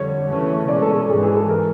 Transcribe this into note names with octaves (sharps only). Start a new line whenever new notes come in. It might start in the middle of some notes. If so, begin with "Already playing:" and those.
Already playing: F2 D3 G3 C#5
C#3 E3 A3 C#4
B2 G#3 C#4 D5
A4
A4
G#2 E3 G#3 G#4
G#4
A4
A#4